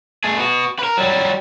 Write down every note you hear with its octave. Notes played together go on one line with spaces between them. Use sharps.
A3 G#4
B3 F#4
A#4 B4
F#3 G3